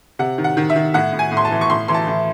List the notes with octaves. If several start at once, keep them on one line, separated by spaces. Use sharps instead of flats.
C3 F#5
D#3
F#5
D#3
E5
D#3
A2 F#5
A2
G#5
A2
C6
A5
E3
C#6
A2 C6
E3 C6
A5
A2